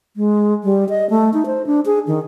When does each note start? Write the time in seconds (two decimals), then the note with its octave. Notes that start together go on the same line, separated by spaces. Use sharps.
0.16 G#3
0.64 G3
0.89 D#5
1.10 A3
1.34 D#4
1.46 C5
1.66 D4
1.86 G#4
2.07 D#3